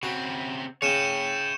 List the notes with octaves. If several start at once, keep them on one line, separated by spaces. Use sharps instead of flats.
C#3 C4 F#4
C#3 C#5 G5 C#7 D#7 E7